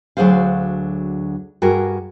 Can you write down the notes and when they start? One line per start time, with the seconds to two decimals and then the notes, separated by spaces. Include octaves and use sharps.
0.17 D2 F#3 D4 G#4 C5 F5
1.62 G2 F#4 G#4 A#4